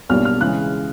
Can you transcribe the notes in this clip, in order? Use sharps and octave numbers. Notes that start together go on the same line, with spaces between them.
B1 B2 G3 A#3 D4 F6
F6
C#3 E3 G#3 F#6